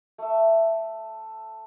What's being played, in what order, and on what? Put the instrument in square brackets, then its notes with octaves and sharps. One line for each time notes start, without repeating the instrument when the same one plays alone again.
[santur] A3 E5